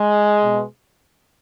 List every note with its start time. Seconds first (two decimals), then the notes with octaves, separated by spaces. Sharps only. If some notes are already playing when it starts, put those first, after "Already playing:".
Already playing: G#3
0.43 B2